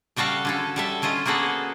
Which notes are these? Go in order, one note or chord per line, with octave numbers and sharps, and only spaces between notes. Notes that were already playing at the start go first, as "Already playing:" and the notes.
C#3 G3 F#4 A4 F5
D3 C#4 A4
G3 A4 E5
D3 C#4 F4 D#5
A#3 B3 F#4 G#4 A4